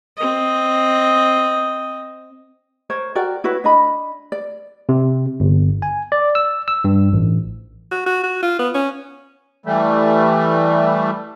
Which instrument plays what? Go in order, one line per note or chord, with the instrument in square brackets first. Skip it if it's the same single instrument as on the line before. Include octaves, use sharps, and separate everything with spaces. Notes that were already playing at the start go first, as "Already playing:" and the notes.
[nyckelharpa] C4 D#5
[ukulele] A#4 C5 C#5
F#4 A#4 D5 G5
E4 F#4 B4 C#5
D4 D#5 B5
D5
[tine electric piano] C3
G1
G#5
D5
E6
E6
G2
A1
[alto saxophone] F#4
F#4
F#4
F4
B3
C#4
[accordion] E3 G3 A3